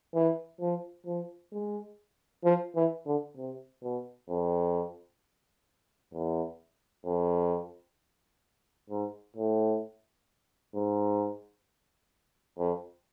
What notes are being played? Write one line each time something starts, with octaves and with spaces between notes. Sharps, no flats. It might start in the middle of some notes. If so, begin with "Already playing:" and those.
E3
F3
F3
G#3
F3
E3
D3
C3
B2
F2
E2
F2
G#2
A2
G#2
F2